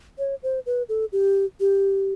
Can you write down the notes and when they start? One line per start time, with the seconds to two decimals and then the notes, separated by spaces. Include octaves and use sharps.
0.19 C#5
0.43 C5
0.66 B4
0.89 A4
1.12 G4
1.60 G4